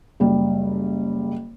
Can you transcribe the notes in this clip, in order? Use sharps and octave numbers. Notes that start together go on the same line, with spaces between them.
F#1 G3